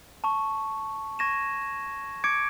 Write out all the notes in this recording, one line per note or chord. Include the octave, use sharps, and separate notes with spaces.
A5 C#6
C#6 G#6 A#6 D#7 E7
D6 G#6 C#7 D7